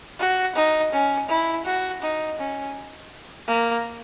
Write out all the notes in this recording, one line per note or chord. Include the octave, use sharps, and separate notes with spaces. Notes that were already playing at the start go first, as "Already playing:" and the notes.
F#4
D#4
C#4
E4
F#4
D#4
C#4
A#3